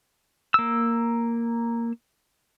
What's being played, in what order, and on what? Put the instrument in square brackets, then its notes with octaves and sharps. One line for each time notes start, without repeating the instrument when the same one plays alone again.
[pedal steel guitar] A#3 E6